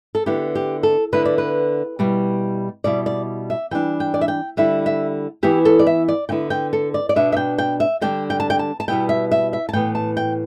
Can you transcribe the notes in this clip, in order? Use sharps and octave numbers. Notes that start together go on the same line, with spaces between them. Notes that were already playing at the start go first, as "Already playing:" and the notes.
A4
D3 B3 E4 G4
G4
A4
D3 B3 E4 B4
D5
B4
B2 G3 E4
B2 G3 E4 D5
D5
E5
E3 G3 D4 G5
G5
D5
E5
G5
D3 G3 E4 E5
E5
E3 B3 E4 G4
A4
D5
E5
D5
D3 B3 E4 G5
G5
A4
D5
D5
B2 B3 D4 E5
E5
G5
G5
E5
D3 G3 D4 G5
G5
A5
G5
A5
A5
B2 G3 B3 E4 G5
E5
E5
E5
A5
A2 E3 B3 G5
A5
G5